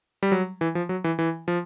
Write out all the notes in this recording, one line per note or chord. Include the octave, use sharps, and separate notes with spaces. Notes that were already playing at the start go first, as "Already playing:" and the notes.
G3
F#3
E3
F3
F#3
E3
E3
F3